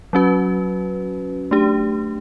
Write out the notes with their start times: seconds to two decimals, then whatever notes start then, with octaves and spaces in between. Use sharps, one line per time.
0.13 F#3 C#4 F#4 B4
1.51 A3 D4 G4